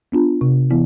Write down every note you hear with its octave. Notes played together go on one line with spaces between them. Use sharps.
B3 D4 F4
C3
E3 B3 E4